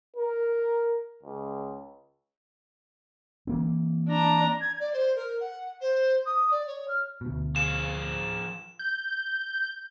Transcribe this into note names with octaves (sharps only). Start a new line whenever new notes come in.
A#4
C#2
E3 A#3 C4
D4 A#5
G#6
D5
C5
A#4
F#5
C5
D#6
D5
C#5
F6
D2 B2
F3 G#4 F5 E7
G6